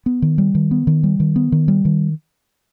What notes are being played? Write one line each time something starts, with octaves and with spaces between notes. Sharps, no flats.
B3
D#3
G3
D#3
B3
D#3
G3
D#3
B3
D#3
G3
D#3